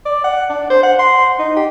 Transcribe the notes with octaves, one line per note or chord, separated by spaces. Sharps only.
D5
F#5
D4
C5
F#5
C6
D#4
G4